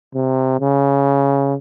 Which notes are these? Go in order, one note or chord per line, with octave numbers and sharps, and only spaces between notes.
C3
C#3